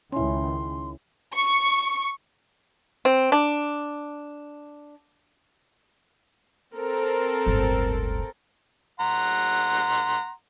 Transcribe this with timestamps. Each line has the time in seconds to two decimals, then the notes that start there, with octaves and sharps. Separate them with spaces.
0.12 C#2 D#3 C#4 E4 C6
1.35 C#6
3.05 C4
3.32 D4
6.75 C4 A4 A#4
7.46 D1 G1
9.00 F#5 A#5 C6